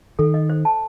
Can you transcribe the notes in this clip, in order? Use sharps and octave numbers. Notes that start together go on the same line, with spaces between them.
D#3 A4
D#5
C5
A5